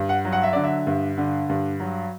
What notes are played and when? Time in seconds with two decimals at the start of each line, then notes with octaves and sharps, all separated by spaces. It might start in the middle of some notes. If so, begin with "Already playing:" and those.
Already playing: G2
0.09 F#5
0.25 F#3
0.33 F#5
0.43 E5
0.53 D3 D5
0.64 E5
0.87 G2
1.18 D3
1.49 G2
1.80 F#3